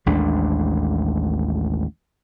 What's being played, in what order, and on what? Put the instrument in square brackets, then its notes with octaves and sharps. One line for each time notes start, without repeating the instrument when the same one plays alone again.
[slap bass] A1 D#2 G#3 D4